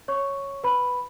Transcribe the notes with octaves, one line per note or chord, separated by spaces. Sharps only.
C#5 C#6
B4 B5